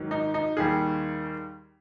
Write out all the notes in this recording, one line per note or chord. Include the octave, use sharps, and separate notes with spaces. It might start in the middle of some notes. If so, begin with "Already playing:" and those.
Already playing: G#2 D#3 F#3
D#4
D#4
D#2 D#3 G3 G#4